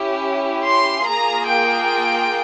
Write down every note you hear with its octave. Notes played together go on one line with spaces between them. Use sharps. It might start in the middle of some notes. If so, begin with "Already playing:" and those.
Already playing: C#4 E4 G4
C6
A#3 F4 G#4 A#5
G5